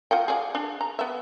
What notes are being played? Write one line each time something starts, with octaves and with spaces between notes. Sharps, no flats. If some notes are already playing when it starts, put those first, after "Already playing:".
F4 F#5 G5
G#4 D5
D4
A#5
B3 E5